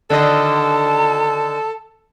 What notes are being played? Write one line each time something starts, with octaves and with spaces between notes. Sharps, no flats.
D3 D#3 A4 D#5 A5